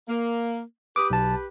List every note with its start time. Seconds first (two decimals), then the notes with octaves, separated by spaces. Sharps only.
0.08 A#3
0.96 G4 B4 D6 D#6
1.10 B1 A5